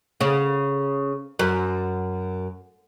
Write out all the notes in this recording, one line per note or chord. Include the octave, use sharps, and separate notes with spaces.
C#3
F#2